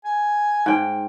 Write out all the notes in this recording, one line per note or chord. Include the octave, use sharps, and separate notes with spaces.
G#5
G#2 G5